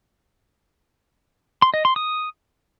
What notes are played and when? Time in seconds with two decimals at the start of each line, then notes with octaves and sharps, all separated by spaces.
1.62 C6
1.74 D#5
1.85 C6
1.96 D#6